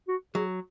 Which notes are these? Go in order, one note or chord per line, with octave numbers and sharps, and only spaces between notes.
F#4
F#3 G#4